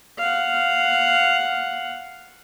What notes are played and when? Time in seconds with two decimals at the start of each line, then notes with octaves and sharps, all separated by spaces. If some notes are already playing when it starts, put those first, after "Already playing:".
0.18 F5 F#5